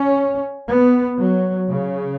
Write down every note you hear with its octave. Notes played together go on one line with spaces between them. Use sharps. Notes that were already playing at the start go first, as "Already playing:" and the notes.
Already playing: C#4
B3
F#3
C#3